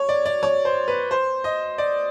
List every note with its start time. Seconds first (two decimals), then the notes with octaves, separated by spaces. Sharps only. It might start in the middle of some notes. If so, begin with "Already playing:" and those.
Already playing: C#5
0.09 D5
0.25 D5
0.43 C#5
0.65 C5
0.88 B4
1.11 C5
1.44 D#5
1.78 D5